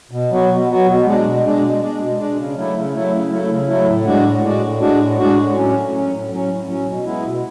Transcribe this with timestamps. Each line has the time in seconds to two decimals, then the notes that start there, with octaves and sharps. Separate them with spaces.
0.11 B2
0.31 F#3 B3 F#4
0.49 B2
0.68 F#3 B3 F#4
0.87 B2
1.06 G#3 D4
1.24 B2
1.43 G#3 D4
1.61 B2
1.80 G#3 D4
1.99 B2
2.18 G#3 D4
2.37 C#3
2.56 F#3 A3 E4
2.74 C#3
2.93 F#3 A3 E4
3.12 C#3
3.30 F#3 A3 E4
3.49 C#3
3.68 F#3 A3 E4
3.87 A2
4.05 G#3 D4 F#4
4.24 A2
4.43 G#3 D4 F#4
4.62 A2
4.80 G#3 D4 F#4
5.00 A2
5.18 G#3 D4 F#4
5.37 A2
5.56 F#3 C#4
5.74 A2
5.93 F#3 C#4
6.12 A2
6.31 F#3 C#4
6.49 A2
6.68 F#3 C#4
6.87 B2
7.05 G#3 B3 E4
7.24 B2